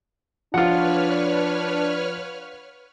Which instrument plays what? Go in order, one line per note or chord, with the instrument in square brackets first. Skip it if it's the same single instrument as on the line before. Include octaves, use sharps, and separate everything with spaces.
[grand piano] F3 [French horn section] D4 [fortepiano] F4 F#5 [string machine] B4 C#5 F6